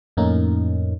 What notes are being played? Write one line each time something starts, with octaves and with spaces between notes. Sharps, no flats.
F2 A2 A3 A#3 C#4 D#4